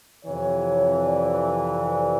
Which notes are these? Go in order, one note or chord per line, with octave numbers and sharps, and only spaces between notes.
F2 C3 E3 C#5
D5
D5